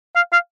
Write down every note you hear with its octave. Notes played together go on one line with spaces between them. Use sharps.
F5
F5